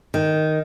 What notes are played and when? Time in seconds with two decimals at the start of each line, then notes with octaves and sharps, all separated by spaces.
0.14 D#3